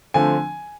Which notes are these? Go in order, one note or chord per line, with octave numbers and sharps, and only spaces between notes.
D3 F3 A3 C4 G#5